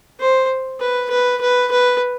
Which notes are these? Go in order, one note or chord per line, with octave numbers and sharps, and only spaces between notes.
C5
B4
B4
B4
B4